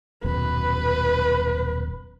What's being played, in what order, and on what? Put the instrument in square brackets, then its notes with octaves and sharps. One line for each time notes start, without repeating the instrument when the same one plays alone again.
[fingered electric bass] D#1 F#2 B2 [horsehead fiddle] B4